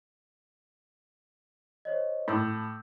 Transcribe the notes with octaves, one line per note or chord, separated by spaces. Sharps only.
C5 C#5 D#5
A2 D6 E6 G6